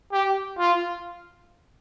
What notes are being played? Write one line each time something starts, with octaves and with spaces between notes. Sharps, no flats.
G4
F4